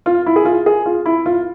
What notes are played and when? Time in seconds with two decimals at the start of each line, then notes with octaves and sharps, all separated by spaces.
0.06 F4
0.26 E4
0.36 G#4
0.45 F4
0.66 G#4
0.86 F4
1.06 E4
1.26 F4